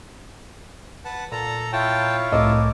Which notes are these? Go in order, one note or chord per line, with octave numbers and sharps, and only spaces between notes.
B4 F#5 A5
A#2 A4 A#5
E4 F4 C#5 G5 A5
C2 A2 A#4 D#5 A5 D6 E6